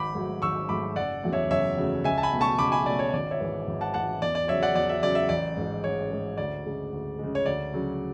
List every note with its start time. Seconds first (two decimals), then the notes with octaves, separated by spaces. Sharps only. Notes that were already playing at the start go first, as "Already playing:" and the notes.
Already playing: G#1 B5 D6
0.15 G#2 F#3 A3
0.42 G#1 C#6 E6
0.69 G#2 F#3 A3 B5 D6
0.96 F#1 D5 F#5
1.23 E2 C#3 F#3 A3
1.33 C#5 E5
1.50 F#1 C#5 E5
1.77 E2 C#3 F#3 A3
2.04 C#2 E5 G#5
2.18 A5
2.23 G#5 B5
2.32 B2 A3
2.41 A5 C#6
2.58 C#2 B5 D6
2.72 G#5 B5
2.86 B2 A3 D5
2.99 C#5
3.13 G#1 D5
3.31 C#5 E5
3.40 G#2 E3
3.67 G#1
3.81 F#5 A5
3.94 G#2 E3 F#5 A5
4.22 E2 D5
4.35 D5
4.48 C#3 F#3 C#5 E5
4.63 D5 F#5
4.75 E2 D5
4.89 E5
5.03 C#3 F#3 D5
5.15 E5
5.29 A1 D5
5.57 G#2 G#3
5.84 A1 C#5
6.11 G#2 G#3
6.37 D2 D5
6.65 C#3 G#3
6.93 D2
7.19 C#3 G#3
7.35 C#5
7.46 D2 D5
7.74 C#3 F#3